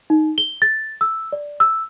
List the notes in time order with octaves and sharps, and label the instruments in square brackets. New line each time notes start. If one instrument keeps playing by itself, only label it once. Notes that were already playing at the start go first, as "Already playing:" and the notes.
[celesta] D#4
G7
A6
E6
D5
E6